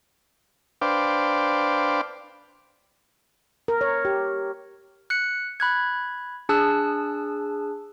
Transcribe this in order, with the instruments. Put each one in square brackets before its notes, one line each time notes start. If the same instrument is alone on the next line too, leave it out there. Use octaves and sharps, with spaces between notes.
[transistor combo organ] D4 B4 C5 F5 G5 D6
[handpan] A#4
C#5
G4
[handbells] F#6 C#7
B5 F#6 G#6
D4 G#4 A5 E6 F#6